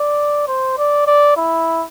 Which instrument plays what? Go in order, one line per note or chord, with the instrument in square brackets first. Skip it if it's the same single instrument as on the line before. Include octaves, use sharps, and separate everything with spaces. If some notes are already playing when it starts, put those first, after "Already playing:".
Already playing: [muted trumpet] D5
C5
D5
D5
E4